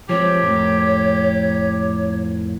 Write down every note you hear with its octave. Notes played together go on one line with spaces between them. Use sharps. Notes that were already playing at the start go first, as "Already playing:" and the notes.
F3 G#3 C4 G4 C#5
F2 A2 A#3